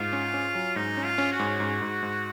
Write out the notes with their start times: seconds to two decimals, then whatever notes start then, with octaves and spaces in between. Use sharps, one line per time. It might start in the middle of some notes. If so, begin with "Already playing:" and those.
Already playing: G#2 F4
0.13 C#4
0.34 C#4
0.55 F#3
0.76 G#2 D#4
0.97 C#4
1.04 F4
1.18 C#4
1.32 F#4
1.39 G#2
1.60 G#2
1.82 G#2
2.03 G#2